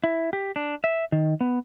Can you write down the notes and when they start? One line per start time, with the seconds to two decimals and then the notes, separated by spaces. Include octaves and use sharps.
0.04 E4
0.33 G4
0.56 D4
0.84 E5
1.12 D#3
1.41 B3